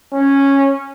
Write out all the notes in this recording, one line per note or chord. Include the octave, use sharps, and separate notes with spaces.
C#4